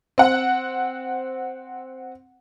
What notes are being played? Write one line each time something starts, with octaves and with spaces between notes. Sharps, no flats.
C4 F#5